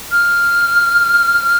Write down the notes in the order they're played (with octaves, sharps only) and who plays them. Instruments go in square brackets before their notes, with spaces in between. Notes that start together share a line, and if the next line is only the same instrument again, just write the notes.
[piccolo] F6